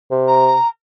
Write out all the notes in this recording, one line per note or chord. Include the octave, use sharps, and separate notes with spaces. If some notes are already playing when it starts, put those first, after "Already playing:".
C3
A#5